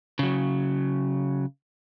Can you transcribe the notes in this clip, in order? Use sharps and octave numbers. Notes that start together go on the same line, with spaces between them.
C#3 F#3